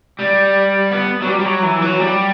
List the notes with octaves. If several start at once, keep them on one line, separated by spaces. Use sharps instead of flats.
G3
B3
F#3
G3
G3
F#3
E3
F#3
G3